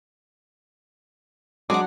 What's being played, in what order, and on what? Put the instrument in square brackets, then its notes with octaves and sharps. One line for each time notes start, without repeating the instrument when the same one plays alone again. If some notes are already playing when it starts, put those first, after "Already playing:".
[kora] F#3 [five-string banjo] G#3 [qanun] D4 F#5 [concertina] D6